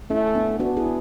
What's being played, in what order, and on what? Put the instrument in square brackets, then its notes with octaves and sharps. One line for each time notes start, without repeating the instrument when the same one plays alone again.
[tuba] A3 [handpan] C#4 E4
[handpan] B3 D4
[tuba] B3 [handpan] D4 F#4
[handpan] E4 G#4